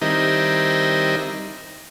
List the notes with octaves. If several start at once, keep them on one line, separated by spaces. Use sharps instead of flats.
D#3 G3 C4 D#4 E4 A#4